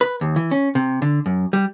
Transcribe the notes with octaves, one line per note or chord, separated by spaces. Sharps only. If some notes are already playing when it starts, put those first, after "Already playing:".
B4
D#2
E3
C#4
C3
D3
F#2
G3